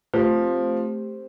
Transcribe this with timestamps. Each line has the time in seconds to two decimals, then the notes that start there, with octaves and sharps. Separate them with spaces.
0.14 F3 A3 C4 G4 C5